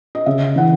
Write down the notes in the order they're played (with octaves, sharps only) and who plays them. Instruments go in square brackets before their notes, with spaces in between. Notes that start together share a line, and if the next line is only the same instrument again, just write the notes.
[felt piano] D#5
C#3 E5
E3 F#5